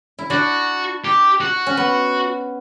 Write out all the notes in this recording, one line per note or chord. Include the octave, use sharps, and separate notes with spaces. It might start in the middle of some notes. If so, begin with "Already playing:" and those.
E4
D4 F#4
G4
F#4
C#4
B3